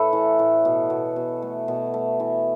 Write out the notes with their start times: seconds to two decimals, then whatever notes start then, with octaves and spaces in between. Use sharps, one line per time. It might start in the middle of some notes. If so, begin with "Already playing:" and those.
Already playing: A2 A3 A4 B4 C#5
0.13 E3
0.39 A2
0.65 B2
0.90 B2
1.16 B2
1.42 A3
1.68 B2
1.94 A3
2.20 E3